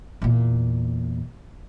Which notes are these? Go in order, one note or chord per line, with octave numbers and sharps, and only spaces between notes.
E2 A#2